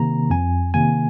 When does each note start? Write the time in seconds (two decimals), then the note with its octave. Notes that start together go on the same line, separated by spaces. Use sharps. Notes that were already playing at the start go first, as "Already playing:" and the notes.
Already playing: C3 D#3 A#3 A#5
0.30 F2 G#5
0.74 C3 D#3 A#3 G#5